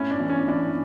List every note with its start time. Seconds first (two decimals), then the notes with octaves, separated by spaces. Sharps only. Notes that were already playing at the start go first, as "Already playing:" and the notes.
Already playing: A2 C#4 E4
0.11 D4
0.20 E3
0.29 C#4
0.48 E3 D4